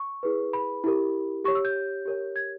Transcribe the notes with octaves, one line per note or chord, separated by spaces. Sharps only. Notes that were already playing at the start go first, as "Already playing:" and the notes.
Already playing: C#6
E4 G#4 B4
B5
E4 G4 A#4
G4 C#5 C#6
E6
G6
G4 A#4 C#5
G#6